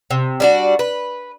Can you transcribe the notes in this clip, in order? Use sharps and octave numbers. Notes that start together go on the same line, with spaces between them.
C3
G3 D4 F#4
B4